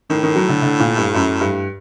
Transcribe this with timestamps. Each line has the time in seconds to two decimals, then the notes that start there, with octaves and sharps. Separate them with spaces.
0.10 A2 D#3
0.23 D#3
0.36 F#3
0.49 D3
0.62 D3
0.80 A#2
0.98 G2
1.15 F#2
1.41 G2